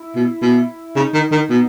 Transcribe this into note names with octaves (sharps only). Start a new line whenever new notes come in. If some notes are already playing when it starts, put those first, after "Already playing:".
Already playing: E4
B2
B2 E4
C#3 D#4
D#3
D#3
B2 B3